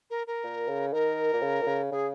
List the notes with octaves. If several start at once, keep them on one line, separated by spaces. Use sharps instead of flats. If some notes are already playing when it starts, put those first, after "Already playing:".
A#4
A#4
A#2
C#3
D#3 A#4
A#2
C#3
A#2
C#3
C#3 G#4